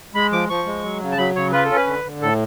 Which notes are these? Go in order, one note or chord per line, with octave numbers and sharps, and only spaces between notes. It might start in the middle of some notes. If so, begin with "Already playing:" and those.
G#3 B5
F3 D6
F3 C#6
G#3
F#3
C#3
A5
F#3 B5
C#3 C#5
F4 B4
A4
C#4
B4
D3
D3
A2 A4